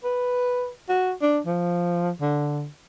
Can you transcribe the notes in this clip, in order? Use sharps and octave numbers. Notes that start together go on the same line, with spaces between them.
B4
F#4
D4
F3
D3